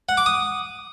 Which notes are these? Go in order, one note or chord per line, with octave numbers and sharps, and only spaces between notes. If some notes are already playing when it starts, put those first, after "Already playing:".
F#5
D6
D#6